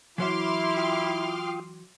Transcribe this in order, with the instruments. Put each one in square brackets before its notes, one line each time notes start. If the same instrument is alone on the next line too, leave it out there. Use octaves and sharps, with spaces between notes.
[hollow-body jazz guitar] E3 F#3 E5 [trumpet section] E4 [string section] C6 D6 F6
[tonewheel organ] F4 G5 D#6